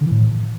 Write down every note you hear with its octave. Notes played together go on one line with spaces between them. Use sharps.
D3
E3
A2